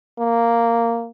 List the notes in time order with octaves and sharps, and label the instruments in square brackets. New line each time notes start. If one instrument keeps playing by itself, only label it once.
[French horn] A#3